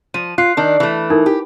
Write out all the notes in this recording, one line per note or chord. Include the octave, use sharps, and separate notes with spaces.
F3 D#7
F4 F#6 C7
D#3 D4
E3 A3
D#4 E4 A#4
G4